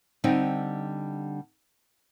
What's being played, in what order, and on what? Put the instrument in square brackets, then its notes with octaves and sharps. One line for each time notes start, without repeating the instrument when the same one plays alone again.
[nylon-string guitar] D3 G3 C4 D#4